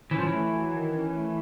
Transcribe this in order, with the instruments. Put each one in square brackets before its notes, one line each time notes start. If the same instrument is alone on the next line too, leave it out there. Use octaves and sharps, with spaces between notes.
[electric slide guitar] E3 [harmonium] C#4
[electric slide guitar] F3
[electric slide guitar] E3 [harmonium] A3
[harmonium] F#3
D#3
C#4
A3